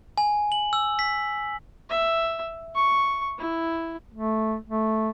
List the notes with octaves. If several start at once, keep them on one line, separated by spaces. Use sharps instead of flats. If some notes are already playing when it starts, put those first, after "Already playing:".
G#5
F#7
E6
B6
E5
C#6
E4
A3
A3